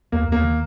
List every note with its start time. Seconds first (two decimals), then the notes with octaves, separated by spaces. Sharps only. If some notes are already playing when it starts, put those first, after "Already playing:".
0.12 D#2 A#3
0.28 D#2 A#3
0.44 D#3